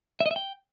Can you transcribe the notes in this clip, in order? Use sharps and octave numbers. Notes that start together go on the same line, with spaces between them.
E5
D#5
E5
G5